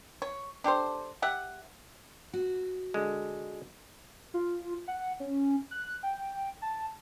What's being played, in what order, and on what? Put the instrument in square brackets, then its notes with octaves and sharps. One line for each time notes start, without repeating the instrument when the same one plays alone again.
[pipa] C#5
D4 G4 A4 C5
G4 E5 F#5
[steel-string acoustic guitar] F#4
[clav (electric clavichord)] D3 G#3
[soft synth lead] F4
F#5
C#4
F#6
G5
A5